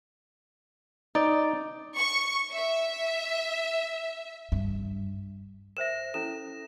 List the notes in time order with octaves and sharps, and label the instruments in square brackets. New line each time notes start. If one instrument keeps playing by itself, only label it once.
[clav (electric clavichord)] D#4 [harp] D5
[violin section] C#6
E5
[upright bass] G2
[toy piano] A#4 C5 E5 [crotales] A#6 E7
[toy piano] C#4 E4 A4 [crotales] E7